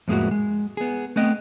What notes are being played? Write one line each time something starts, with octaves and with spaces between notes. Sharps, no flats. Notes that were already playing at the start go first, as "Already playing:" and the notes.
F2 A2 G#3 A#3 E4 F#4
G#3
B3 G#4
A3 B3 C4 B4 D#5 G5